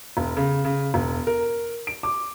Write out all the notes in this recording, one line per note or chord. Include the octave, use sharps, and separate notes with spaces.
E1
C#3
C#3
E1
A#4
D7
D6